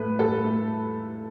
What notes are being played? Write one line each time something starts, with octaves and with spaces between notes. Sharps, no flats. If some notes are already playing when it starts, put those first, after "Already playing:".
Already playing: A2 A3 B4
A2 A4
A3